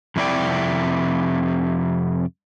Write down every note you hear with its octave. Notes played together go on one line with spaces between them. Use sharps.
F2 C3 E4 D5 G5